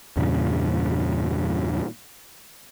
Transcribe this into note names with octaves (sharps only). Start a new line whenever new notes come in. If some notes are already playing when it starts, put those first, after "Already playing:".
E2 G2 A#2 C#3